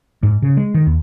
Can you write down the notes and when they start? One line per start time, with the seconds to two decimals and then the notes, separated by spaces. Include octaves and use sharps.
0.23 G#2
0.42 C#3
0.57 G#3
0.74 D#3
0.87 D#2